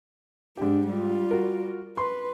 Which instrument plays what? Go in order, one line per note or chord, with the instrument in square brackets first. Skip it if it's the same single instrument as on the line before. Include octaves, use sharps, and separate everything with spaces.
[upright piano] G#2 G4 [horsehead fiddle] D4
[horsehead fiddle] G3 F4
[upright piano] F#4 A#4
[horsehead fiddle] B4 [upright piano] C6